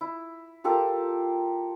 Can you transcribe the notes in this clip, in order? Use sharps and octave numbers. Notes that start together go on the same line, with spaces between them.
E4
F4 G4 A4 A#4